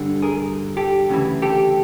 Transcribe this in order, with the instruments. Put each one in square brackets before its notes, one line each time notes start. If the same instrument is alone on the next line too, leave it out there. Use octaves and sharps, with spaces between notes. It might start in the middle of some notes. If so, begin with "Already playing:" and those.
Already playing: [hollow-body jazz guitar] G2 D3
G#4 A#4
G4 A4
D2 C#3 E3
G4 A4